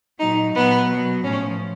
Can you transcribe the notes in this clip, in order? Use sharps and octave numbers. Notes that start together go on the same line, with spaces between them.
A#2 F#3 D#4
A#2 F#3 B3
B2 F#3
A2 F3 C#4